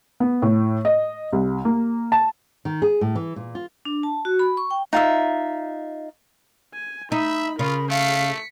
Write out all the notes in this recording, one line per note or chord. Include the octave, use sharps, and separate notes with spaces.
B3
A2
D#5
C2
A#3
A5
D#3
G#4
A2
E3
A#2
F4
D4
A5
F#4
B5
C#6
G5
D#4 F4 E5
G#5
D#4 E5 B5
C#3 F4 A#4 B5
A3 F5 B6 C#7